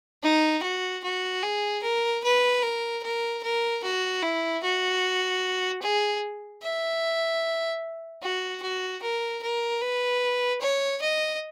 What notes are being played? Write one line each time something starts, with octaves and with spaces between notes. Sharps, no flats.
D#4
F#4
F#4
G#4
A#4
B4
A#4
A#4
A#4
F#4
E4
F#4
G#4
E5
F#4
F#4
A#4
A#4
B4
C#5
D#5